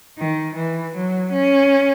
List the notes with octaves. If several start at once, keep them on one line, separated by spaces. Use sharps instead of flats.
D#3
E3
F#3
C#4